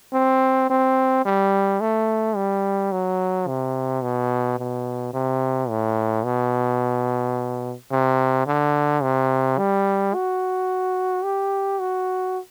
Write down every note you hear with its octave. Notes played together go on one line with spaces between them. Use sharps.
C4
C4
G3
A3
G3
F#3
C3
B2
B2
C3
A2
B2
C3
D3
C3
G3
F#4
G4
F#4